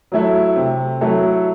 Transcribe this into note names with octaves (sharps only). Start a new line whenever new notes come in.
F#3 A3 E4 A4
C3
F#3 A3 E4 A4